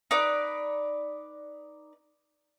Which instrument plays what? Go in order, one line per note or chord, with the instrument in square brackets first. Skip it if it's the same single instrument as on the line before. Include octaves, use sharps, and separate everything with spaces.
[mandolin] D#4 B4 D5